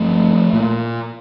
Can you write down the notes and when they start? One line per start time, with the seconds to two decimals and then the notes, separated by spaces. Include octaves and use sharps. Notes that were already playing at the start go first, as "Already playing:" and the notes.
Already playing: G1 G2 F3 A3
0.53 A#2